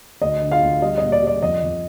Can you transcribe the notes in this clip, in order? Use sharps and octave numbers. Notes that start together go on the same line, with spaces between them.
D2 D#5
D3
F4 F5
D2
G3 D#5
A#2 D#5
D5
G3 D5
F2 D#5
F2